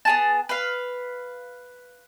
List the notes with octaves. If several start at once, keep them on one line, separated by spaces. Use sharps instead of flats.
B3 G#4 A5
B4 F5